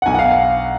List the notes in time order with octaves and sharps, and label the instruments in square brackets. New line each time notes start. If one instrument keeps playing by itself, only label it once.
[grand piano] F#5
B1 B2 G#5
F#5
F5
F5